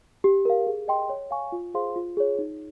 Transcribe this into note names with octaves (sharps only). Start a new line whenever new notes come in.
G4
A#4 F5
G#4
D#5 G5 C6
C#5
F5 G#5 C#6
F4
G#4 C5 F5 C6
F4
G#4 C#5
D#4